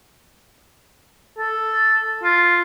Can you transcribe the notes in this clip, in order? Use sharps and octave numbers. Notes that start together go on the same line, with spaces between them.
A4
F4